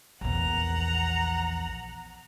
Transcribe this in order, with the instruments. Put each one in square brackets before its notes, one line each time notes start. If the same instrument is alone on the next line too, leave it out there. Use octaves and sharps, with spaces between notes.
[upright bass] A#1 E2 [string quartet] F#5 A#5